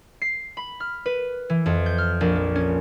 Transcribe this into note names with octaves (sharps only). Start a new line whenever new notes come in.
C7
B5
F6
B4
E3
F2
G6
F6
A#1
A#3
C#4